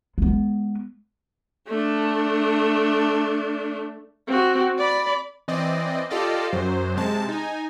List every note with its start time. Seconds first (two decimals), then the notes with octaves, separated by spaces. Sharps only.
0.18 G#3 B3
1.68 A3 D4
4.27 C4 F#4
4.78 D5 B5
5.48 E3 C4 D5 D#5
6.10 F4 G4 A4 D5 D#5 F5
6.53 F#2 F#3 C5
6.96 C3 G#3 A5
7.29 D#4 G#5